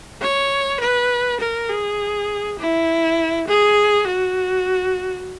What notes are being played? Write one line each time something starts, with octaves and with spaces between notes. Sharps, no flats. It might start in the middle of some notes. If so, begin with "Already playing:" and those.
C#5
B4
A#4
G#4
E4
G#4
F#4